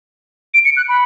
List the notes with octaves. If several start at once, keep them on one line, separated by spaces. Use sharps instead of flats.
D7
C#7
F#6
B5